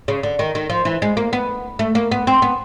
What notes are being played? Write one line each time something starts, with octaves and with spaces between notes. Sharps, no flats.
C#3
D3
D#3
D#3
F3
E3
G#3
A#3
B3
A3
A#3
B3
C4
B3